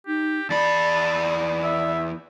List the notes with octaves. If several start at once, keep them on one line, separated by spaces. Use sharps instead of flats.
D#4 G4
E2 D5 A5 B5
E5